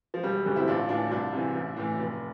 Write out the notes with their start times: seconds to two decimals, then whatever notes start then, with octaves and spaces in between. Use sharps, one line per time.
0.14 F3
0.23 E1 G3
0.46 D2 D3 G3
0.56 C4 E4
0.68 A1 D4 F4
0.89 A2 E3 D4 F4
1.11 C2 D4 F4
1.33 C3 E3
1.55 A1
1.76 A2 E3
1.99 F1